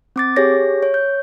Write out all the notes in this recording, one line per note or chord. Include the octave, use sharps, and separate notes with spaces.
C4 D6 A6
G4 G#4 C#5 A#6
C#5
G6